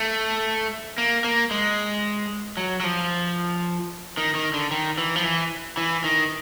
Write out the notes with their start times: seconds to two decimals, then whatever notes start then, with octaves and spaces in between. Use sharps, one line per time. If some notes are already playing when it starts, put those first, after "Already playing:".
Already playing: A3
0.98 A#3
1.24 A#3
1.51 G#3
2.57 F#3
2.80 F#3
2.84 F3
4.17 D#3
4.35 D#3
4.54 D3
4.71 D#3
4.98 E3
5.16 F3
5.24 E3
5.77 E3
6.04 D#3